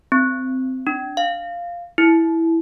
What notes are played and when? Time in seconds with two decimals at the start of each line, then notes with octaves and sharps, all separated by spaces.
0.12 C4
0.87 D4
1.17 F5
1.98 E4